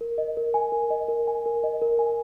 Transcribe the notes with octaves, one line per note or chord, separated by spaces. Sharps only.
A#4
D#5
A#4
G#5
A#4
D#5
A#4
G#5
A#4
D#5
A#4
G#5